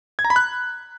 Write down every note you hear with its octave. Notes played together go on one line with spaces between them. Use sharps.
G#6
A#5
B5
F#6